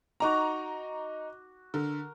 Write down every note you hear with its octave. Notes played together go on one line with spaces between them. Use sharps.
D#4 F#4 A#5 D6
D3 A#4